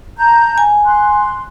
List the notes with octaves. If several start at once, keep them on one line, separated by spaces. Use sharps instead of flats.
A5 A#5 G6
G#5
C6 F#6